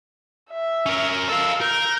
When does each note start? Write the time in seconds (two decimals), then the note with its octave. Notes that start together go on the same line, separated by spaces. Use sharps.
0.50 E5
0.86 C#4 A#4
1.29 A4 F5 E6
1.61 A#4 G6